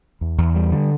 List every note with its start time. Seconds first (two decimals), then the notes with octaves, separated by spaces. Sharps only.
0.21 E2
0.38 E2
0.55 G3
0.72 D3